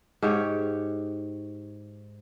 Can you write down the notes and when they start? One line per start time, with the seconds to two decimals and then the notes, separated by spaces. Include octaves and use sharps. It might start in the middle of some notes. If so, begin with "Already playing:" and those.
0.22 G#2 G4 C#5